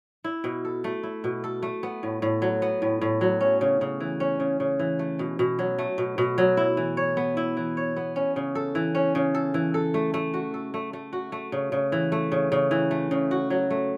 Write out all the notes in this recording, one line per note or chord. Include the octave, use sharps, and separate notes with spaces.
E4
B2
A4
A3
E4
B2
A4
A3
B3
A2
A2
F#3
B3
A2
A2
F#3
C#4
C#3
C#3
E3
C#4
C#3
C#3
E3
A3
B2
B2
F#3
A3
B2
B2
F#3
E4
E3
C#5
B3
E4
E3
C#5
B3
C#4
C#3
A4
E3
C#4
C#3
A4
E3
A4
A3
A3
F#4
A4
A3
A3
F#4
A3
C#3
C#3
E3
A3
C#3
C#3
E3
A3
C#3
F#4
F#3
A3